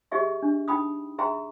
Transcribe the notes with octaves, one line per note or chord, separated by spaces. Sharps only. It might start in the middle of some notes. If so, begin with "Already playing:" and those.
G4 G#4 D#5 E5 C#6
D4
D#4 G5 B5 D#6
G#4 E5 G5 A#5 C6